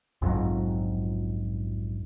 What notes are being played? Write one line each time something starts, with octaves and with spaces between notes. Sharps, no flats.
A#1 F2 G#2 F#3